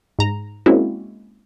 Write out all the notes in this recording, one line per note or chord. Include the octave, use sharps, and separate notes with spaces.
G#2 A#5
G#3 A#3 C4 C#4 E4 F#4